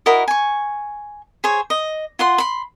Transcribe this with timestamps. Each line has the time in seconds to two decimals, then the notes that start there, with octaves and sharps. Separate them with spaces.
0.06 E4 F#4 A#4 D#5
0.28 G#5 C#6
1.44 G#4 C5 C#5
1.70 D#5
2.19 F4 F#5 C6
2.38 B5 C6